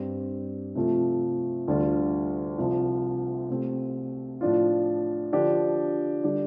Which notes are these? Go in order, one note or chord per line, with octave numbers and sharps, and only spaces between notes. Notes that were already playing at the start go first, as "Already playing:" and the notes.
Already playing: G2 G3 C4 G4
C3 F3 A3 C4 F4
D2 D3 G3 F4
C2 C3 F3
C3 A3 C4 G4
A2 F3 D4 F4
D3 F3 D4 G4
D3 G3 D4 G4